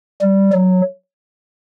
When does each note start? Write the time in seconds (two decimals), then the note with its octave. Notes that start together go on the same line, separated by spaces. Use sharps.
0.21 G3
0.52 F#3